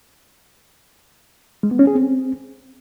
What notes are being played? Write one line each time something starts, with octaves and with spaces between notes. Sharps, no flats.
G#3
B3
C#4
G#4
C4